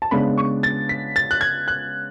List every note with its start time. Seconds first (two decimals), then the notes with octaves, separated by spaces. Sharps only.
0.02 A5
0.11 C#3 G#3 B3 D4 B5
0.38 C#6
0.63 A6
0.89 B6
1.16 A6
1.31 F#6
1.41 G#6
1.68 F#6